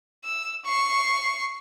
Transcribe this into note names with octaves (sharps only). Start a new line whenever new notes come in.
E6
C#6 C7